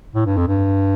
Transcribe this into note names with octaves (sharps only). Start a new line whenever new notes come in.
A2
G2
F2
G2